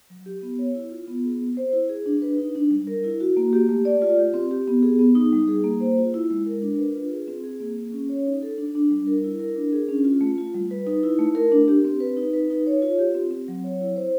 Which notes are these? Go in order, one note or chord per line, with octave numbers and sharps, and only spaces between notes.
F#3
G4
B3
C#5
E4
F4
B3
G#4
C4
C5
E4
G#4
D4
B4
D#4
D4
G3
A#4
E4
F#4
A#3
G4
A3
D5
F4
G4
C4
G4
B3
G#4
B3
D#4
G3
G#4
A#3
C5
F4
E4
G#3
A#4
D4
B4
F4
G#4
C4
G#4
A#3
G#4
C#4
C#5
D#4
A4
D4
D4
G3
A#4
E4
A#4
D4
G#4
C#4
F4
A3
F4
G3
B4
D#4
E4
A3
A#4
D4
G4
C4
B4
D#4
B4
D#4
C#5
F4
G4
C4
C4
F#3
C#5
E4
C5